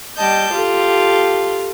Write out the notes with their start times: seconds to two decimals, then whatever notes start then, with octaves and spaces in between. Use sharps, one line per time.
0.17 G3 D#5 G5 A5 G6
0.52 F4 G4 A4